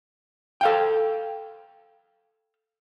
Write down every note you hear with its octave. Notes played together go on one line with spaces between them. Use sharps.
A4 F5 G5